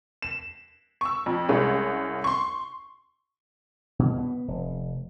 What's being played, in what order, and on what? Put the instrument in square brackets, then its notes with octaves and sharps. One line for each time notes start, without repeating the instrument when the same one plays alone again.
[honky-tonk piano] E7
C#6 E6
F2
C2 G#3 C#4
C6 C#6
[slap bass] B2
B3
F1